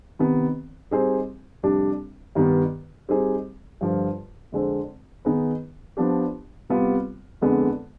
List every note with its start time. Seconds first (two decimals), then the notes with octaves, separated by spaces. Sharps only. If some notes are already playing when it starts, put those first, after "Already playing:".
0.19 C3 D#3 B3
0.91 G3 C4 D#4 G#4 C5
1.63 F2 C3 G3 D4
2.35 G2 D#3 G3 B3
3.09 G3 C4 D#4 G#4
3.81 G2 D3 F3
4.52 F2 D3 G#3 C4
5.25 D#3 B3 D#4 G#4 B4
5.97 F3 B3 D4 G4
6.70 C3 G3 B3 F4
7.41 F2 D3 G#3 B3